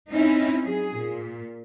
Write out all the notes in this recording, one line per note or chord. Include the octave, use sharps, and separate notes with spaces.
C4 C#4 D#4 E4
F#3 G#4
A#2